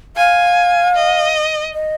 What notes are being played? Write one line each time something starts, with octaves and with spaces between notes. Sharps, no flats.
F5 G#5
D#5
D#5